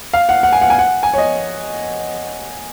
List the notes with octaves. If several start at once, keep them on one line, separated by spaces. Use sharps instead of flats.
F5
F#5
F#5
G#5
F#5
G#5
F#5
G#5
C#5
D#5